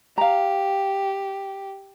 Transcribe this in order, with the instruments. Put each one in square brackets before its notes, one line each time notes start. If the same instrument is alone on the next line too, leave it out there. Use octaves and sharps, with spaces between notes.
[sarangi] G4 [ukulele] F5 A#5